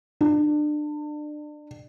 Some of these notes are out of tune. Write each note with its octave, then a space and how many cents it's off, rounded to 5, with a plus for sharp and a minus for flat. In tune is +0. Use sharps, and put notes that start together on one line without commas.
D4 +30